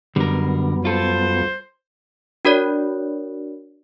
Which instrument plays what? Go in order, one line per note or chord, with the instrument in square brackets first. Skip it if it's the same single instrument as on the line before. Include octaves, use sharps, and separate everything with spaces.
[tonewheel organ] F#2 B3 [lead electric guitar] D3 A#4 [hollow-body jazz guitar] G3
[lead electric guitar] F4 A4 [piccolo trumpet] C5
[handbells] D4 F#4 A#4 C#5 D5